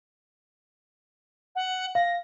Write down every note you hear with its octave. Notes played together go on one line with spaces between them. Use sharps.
F#5
F5 A#6